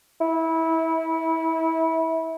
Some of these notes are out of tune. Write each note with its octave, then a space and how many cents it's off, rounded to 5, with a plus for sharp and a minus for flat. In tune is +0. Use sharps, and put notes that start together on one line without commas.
E4 -25